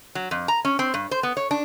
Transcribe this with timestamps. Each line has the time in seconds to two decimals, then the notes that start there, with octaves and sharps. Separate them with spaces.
0.15 F#3
0.31 F2
0.48 A#5
0.65 C#4
0.79 C4
0.94 G2
1.11 C5
1.23 B3
1.37 C#5
1.51 D4